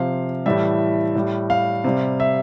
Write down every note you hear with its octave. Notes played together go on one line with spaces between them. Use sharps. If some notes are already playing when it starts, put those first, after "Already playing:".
Already playing: C3 F3 F5
A2 E3 G3 E5
A2 G3
F5
C3 G3
E5